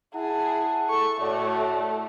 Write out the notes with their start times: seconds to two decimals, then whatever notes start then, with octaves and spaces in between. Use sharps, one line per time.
0.15 E4 G#4 F#5 A5
0.89 A4 C#6
1.20 A2 A3 F#4 C#5 D5